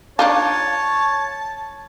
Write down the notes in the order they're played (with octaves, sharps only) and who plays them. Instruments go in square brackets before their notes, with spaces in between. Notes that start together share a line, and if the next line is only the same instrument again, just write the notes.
[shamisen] D4 D#4 F4 [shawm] C#5 [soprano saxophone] A5